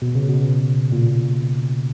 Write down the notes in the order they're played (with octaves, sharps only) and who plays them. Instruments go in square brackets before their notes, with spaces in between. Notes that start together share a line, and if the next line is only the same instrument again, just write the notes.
[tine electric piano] B2
C#3
B2
A#2